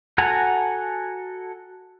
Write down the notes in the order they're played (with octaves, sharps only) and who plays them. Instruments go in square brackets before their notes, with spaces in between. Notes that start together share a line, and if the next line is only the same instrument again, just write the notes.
[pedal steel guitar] F#4 A4 F#5 G#5 A#5